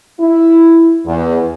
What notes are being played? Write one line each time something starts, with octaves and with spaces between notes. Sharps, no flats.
E4
E2